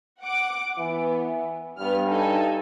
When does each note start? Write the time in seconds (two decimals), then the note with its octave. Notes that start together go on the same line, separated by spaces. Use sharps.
0.21 F#5 D6
0.79 E3 B3
1.78 G2 B3 F6
2.10 D#4 A4 G#5